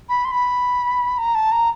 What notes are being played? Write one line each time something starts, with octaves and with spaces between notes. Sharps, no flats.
B5
C6
B5
A#5
A5
A#5